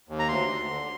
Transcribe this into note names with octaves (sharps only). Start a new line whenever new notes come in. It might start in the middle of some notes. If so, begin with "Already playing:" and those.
D#2
A#5
D2 C6
D2
D3